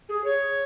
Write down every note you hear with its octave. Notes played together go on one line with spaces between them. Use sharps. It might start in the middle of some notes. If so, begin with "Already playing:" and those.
G#4
C#5